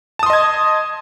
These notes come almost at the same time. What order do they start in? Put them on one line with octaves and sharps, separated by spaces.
A5 D#6 C6 D#5 G#6